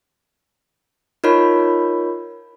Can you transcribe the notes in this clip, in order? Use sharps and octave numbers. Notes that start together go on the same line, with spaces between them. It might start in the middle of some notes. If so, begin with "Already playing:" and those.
D#4 F4 A#4 C#5 B5